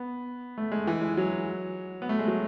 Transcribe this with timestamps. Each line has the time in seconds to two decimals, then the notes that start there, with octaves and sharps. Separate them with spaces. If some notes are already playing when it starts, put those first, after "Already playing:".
Already playing: B3
0.58 A3
0.72 G#3
0.87 E3
1.01 G#3
1.17 F#3
2.02 B3
2.09 A3
2.19 G#3
2.27 F#3